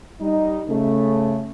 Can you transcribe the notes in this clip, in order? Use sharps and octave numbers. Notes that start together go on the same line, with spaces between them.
G3 D#4
C#3 A3